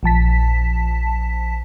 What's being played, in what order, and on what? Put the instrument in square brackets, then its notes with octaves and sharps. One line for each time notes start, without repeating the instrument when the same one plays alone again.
[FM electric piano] A#1 F3 A5 B6